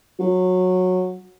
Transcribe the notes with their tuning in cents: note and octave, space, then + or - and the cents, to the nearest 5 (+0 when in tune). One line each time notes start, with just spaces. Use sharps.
F#3 -15